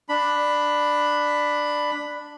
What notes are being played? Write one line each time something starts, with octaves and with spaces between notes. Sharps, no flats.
D4 B5